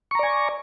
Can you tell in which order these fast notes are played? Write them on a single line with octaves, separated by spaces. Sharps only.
C#6 A#5 D5 G#5